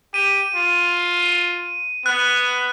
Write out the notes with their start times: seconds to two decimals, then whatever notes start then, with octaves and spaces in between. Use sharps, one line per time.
0.14 G4 D#7
0.55 F4
2.06 B3 F#6